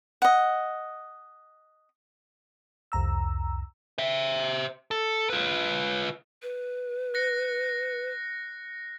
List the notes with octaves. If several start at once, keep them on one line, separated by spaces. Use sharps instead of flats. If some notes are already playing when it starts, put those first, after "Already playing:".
D#5 F#5
C2 F2 A#5 E6
C5 E5
A4
F4 B4
B4
F#6 A#6 C#7